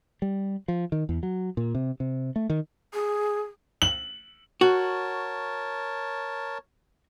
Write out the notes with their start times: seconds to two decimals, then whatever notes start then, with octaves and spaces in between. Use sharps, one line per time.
0.22 G3
0.68 F3
0.92 D#3
1.09 E2
1.23 F#3
1.57 A#2
1.75 C3
2.00 C3
2.36 A3
2.50 D#3
2.94 G#4
3.82 F#7
4.61 F#4 A#4 C#5 A5